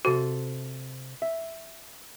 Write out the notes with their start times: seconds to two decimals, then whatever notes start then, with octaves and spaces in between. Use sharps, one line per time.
0.05 C3 F#4 A4 C5
1.22 E5